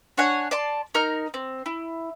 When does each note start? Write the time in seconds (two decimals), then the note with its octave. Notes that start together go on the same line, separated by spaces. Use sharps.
0.17 D4 C#5 F#5 G#5
0.51 D5 A5 C6
0.94 D#4 A#4 A#5 F6
1.34 C4
1.66 E4